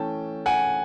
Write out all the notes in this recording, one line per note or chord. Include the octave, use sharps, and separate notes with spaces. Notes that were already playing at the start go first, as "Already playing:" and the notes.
Already playing: E3 A3 C#4 G5 A5
F#5 G#5